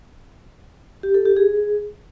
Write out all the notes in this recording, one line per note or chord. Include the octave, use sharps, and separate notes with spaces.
G4
A4
G4
G#4